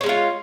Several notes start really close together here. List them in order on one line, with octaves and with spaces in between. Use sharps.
C#5 G#3 C#4 F4